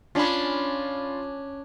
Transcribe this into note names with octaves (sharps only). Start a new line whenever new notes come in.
C#4 D4 F4 B5